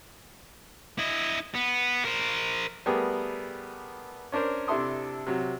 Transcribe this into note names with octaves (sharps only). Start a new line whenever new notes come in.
E4 D#5
B3
A#4 C5
G3 A3 B3 G4 G#4 A#4
C#4 D4 A#4 C5
C3 D4 E4 A4 C6 D#6
C3 F#3